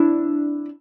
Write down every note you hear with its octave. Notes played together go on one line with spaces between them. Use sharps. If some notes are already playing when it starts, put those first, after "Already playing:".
Already playing: D4 E4